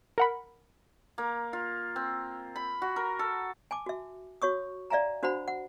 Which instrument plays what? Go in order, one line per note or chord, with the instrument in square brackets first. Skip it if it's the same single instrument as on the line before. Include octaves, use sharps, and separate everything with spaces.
[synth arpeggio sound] A#4 F#5 B5
[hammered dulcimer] A#3
F4
C4
B5
F#4
A#4
A4
[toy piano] G#5 A5 D6
F#4 E5
F#4 C#5 C#6 D#6
D5 E5 F5 G#5 A#5
D4 F#4 C5 F#5 B5
F#5